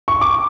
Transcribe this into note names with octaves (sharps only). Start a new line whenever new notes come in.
C#6
D6